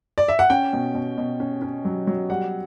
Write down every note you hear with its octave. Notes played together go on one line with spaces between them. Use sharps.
D5
E5
F#5
C#4 G5
B2
B2
B2
C#4
C#4
F#3
F#3
G3 F#5